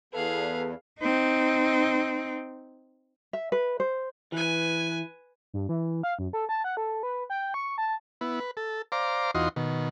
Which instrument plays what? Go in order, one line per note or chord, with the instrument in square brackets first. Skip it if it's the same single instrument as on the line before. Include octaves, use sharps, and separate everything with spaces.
[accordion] E2 [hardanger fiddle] G#4 F5 [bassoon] A4 [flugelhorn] B4
[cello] C4 D#4
[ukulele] E5
B4
C5
[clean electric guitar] E3 [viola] B4 G#5
[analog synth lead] G2
E3
F5
F#2
A4
A5
F#5
A4
B4
G5
C#6
A5
[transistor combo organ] B3 E4
B4
A4
C5 D5 F5 A#5 D6
E2 D#4 F4 F#4 D#5 C6
B2 D#3